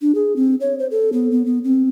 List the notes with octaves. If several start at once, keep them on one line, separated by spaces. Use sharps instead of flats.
D4
G#4
C4
C#5
C5
A4
B3
B3
B3
C4